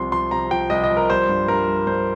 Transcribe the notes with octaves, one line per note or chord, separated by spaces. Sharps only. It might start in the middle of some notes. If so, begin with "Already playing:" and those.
Already playing: C2 C3 F3 C6
F3 C6
C3 A#5
F3 G5
C2 D#5
D#5
F3
A#4
G3 C5
G2
G2 A#4
G3
G2 C5